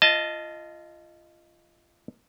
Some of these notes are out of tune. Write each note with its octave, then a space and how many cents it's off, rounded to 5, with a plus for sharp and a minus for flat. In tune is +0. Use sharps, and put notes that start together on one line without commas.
F4 -25 D#5 +0 A5 +0